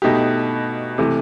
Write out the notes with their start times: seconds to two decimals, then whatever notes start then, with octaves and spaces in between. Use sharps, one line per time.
0.02 B2 A3 D#4 G4
0.98 C3 E3 A3